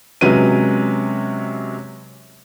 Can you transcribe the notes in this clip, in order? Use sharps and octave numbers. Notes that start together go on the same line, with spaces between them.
C3 F#3 G#3 C#4 B4 D#7